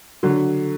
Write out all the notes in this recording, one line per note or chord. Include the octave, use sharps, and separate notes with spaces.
D3 F#3